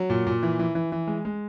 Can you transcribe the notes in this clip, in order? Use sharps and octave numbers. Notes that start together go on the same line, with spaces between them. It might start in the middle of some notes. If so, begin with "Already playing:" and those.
Already playing: F#3
A#2
A#2
E3
E3
E3
E3
G#3
G#3